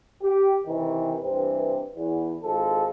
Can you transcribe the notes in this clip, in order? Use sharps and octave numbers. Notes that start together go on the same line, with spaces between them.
G4
C3 D#3 E3
G2 C3 E3 C4
E2 E3
G#1 F3 G#3 A4